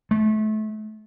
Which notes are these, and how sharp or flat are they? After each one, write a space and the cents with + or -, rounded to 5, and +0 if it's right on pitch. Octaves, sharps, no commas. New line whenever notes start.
A3 -30